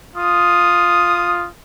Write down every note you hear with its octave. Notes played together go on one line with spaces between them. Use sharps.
F4 D#6